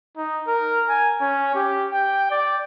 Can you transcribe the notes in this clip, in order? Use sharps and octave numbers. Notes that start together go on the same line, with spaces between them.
D#4
A#4
G#5
C#4
G4
G5
D5